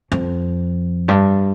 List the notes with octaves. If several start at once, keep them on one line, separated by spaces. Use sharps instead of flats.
F2
G2